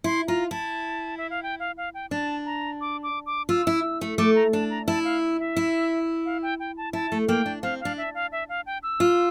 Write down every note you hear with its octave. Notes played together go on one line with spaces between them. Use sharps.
E4 C6
F4 A#5
E4 A5
E5
F5
G5
F5
F5
G5
D4 A5
A#5
D6
D6
D6
F4 E6
E4
A3
A3 D6
A#5
D4 A5
A#5
E4 A5
F5
E5
E4
F5
G5
G5
A5
E4 A5
A3
A#3 G5
D4
C4 F5
D4 F5
E5
F5
E5
F5
G5
E6
F4